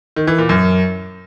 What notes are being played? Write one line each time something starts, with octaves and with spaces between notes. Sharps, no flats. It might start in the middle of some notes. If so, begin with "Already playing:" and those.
D#3
E3
A#2
F#2